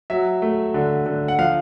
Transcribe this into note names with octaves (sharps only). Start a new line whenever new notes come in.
F#3 E5
A3
D3
D3
F#5
F3 F5